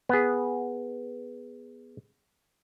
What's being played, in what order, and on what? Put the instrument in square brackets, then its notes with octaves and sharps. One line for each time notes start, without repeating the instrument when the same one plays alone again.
[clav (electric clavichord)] B3 G#4